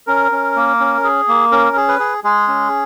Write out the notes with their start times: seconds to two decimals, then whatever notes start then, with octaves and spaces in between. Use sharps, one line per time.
0.07 C#4 A#4
0.32 C#4
0.56 A#3
0.80 C#4
1.04 G#4
1.28 A#3
1.52 C#4 A#4
1.76 G#4
1.88 B4
1.99 G#4
2.24 G#3 G#4
2.48 C#4